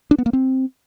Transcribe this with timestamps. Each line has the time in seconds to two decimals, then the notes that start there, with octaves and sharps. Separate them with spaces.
0.11 D4
0.18 B3
0.26 A#3
0.33 C4